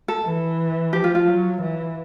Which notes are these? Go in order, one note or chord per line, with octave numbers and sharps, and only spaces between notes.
A4
E3
F3 G4
F4
F4
F#3
E3